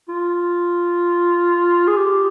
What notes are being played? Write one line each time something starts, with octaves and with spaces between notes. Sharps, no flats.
F4
G#4
G4